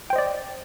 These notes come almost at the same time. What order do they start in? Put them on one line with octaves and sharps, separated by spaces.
G5 C5 D#5 D5